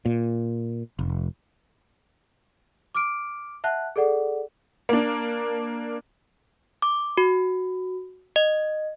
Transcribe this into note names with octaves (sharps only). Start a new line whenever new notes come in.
A#2
F1
D6 F6 D7
E5 F#5 A5 F#6
G#4 A4 D5 F#5
A#3 D4
D6
F#4
D#5